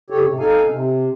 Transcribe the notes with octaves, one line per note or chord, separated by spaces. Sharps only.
C#3 G4 A4 C#5
G#2 C3
D#4 A4 F5 G#5
C3